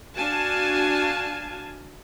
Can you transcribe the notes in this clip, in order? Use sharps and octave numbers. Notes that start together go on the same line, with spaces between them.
D4 F#4 F5 G#5 A5